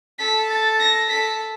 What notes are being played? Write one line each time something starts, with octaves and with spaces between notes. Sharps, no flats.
A4 B6
A6
A#6
A4 B6